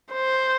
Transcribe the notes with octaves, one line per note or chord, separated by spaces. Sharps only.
C5